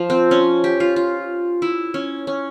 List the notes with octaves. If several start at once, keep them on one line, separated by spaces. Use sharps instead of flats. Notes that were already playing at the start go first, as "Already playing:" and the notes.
Already playing: F3
C4
C#4
G4
F4
F4
E4
C#4
C#4